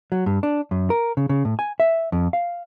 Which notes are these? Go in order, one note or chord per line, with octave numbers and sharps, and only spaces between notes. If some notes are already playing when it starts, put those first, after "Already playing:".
F#3
G2
D4
F#2
A#4
C#3
C#3
A2
G#5
E5
F2
F5